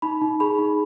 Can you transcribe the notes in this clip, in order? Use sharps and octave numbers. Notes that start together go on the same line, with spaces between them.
D#4 B5
D#4
G#4 B5
D#4